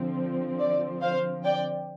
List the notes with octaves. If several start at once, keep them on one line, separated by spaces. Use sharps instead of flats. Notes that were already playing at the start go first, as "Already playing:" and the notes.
Already playing: D3 F3 C4
D5
C5 F5
D5 G5